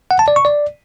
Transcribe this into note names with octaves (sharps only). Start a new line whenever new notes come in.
F#5
A5
D5
C#6
D5